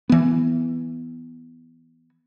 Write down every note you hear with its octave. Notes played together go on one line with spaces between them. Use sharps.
E3 B3